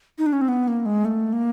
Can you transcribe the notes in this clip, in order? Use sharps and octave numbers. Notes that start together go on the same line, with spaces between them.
D#4
D4
C#4
C4
B3
A#3
G#3
A3
A#3